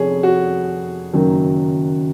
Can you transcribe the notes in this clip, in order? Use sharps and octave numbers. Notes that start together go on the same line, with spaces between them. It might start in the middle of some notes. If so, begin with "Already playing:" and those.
Already playing: F1 F2 G#4 C#5
F#4
F#1 F#2 D#3 F#3 A#3